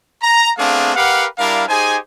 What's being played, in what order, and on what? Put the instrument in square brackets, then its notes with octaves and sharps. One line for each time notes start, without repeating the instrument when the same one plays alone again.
[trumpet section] A#5
A3 B3 C4 D4 G#4 F5
G4 A#4 B4 F5 F#5
G3 D4 E4 A#4 F5
D#4 G4 G#4 C5 G#5